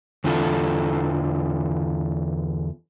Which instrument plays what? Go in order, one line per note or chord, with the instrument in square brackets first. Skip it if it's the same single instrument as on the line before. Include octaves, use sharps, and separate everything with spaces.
[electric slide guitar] E2 D3 E3 F4 A4